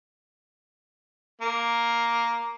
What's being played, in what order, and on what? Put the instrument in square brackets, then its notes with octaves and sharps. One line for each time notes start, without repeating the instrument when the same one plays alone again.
[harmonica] A#3